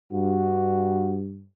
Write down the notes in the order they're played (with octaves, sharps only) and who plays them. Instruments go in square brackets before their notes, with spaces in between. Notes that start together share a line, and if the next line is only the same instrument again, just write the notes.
[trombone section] G2 [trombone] F#4